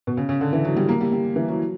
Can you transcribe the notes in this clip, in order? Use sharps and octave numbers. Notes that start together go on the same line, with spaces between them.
B2
C#3
C#3
D3
E3
F#3
G3
A#3
G3
G3
E3
F#3